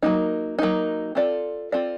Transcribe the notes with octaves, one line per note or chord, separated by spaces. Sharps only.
F#3 A#3 D#4
F#3 A#3 D#4
C4 F4 A4 D5
C4 F4 A4 D5